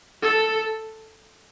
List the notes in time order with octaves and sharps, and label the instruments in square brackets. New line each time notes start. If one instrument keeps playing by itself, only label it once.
[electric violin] A4